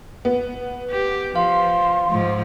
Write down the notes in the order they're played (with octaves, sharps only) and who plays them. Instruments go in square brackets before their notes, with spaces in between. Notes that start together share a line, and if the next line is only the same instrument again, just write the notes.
[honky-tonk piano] B3
[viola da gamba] G4
[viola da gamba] F3 [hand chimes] F5 [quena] C6
[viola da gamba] G#2 F3